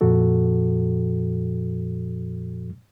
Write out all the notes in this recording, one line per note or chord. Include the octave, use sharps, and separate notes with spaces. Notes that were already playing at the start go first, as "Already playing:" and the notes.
F2 A#2 F3 F#4 A4